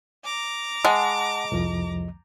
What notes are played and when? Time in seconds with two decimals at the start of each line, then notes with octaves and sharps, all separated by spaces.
0.25 A#5 D6
0.85 G#3 F#5 A5
1.52 C2 F2 F3